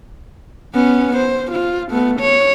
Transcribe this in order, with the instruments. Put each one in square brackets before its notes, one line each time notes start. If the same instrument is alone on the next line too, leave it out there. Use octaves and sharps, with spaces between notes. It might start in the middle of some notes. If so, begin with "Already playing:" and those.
[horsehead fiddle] B3 C#4
C5
F4
A3 B3
C#5